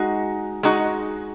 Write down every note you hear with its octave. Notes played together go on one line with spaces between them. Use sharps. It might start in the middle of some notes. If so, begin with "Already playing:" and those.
Already playing: G#3 D#4 F#4
G#3 D#4 F#4